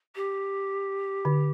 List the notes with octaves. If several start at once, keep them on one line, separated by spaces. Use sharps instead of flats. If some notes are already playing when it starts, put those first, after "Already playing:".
G4
D3